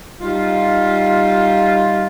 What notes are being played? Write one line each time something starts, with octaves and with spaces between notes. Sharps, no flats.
G3 D#4 F4